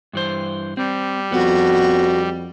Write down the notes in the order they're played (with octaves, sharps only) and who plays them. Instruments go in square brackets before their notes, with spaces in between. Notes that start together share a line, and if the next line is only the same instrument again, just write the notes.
[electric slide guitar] G2 E3 C5
[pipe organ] G3 [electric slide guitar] C4
[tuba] F2 [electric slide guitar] B3 [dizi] F#4